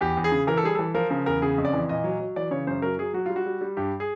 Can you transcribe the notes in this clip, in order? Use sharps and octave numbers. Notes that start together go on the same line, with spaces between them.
E2 G4
E2
G#4
C#3
E3 A#4
A4
G3 G#4
E3 A4
F3 A#4
C#3 A#4
E2 A#4
C#3 G#4
F2
D5
E3
A#2 D#5
F#3
F#3
E3 D5
C#3 C#5
F#2 C5
F#3 A#4
F#3 G#4
F#3 F#4
G3 F4
F#4
G3
G3
G2 G4
G#4